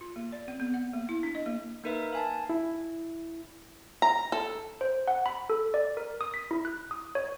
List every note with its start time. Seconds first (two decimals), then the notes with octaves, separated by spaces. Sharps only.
0.01 F4
0.16 A#3
0.32 D5
0.48 C4
0.60 B3
0.74 F#5
0.93 A#3
1.09 E4
1.23 D4
1.35 D#5
1.46 A#3
1.84 A#3 D#4 A#4 B4 E5
2.13 F5 G#5 A5
2.50 E4
4.02 A#5
4.32 A4
4.81 C5
5.08 F#5
5.26 B5
5.50 A4
5.74 D5
5.97 A#4
6.21 D#6
6.34 B6
6.51 E4
6.65 F#6
6.91 D#6
7.15 C#5